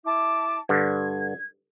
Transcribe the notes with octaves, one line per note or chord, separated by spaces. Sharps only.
E4 A5 D6
G2 D3 G#6